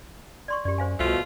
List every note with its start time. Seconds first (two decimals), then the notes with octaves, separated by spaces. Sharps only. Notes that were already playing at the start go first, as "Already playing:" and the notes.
0.48 D5 C6 C#6
0.65 F#2 G4 D5
0.78 C5 F5 G#5
0.99 C2 B2 F3 A3 F4